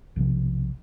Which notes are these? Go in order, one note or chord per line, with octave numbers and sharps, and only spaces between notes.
B1 C3 E3 F3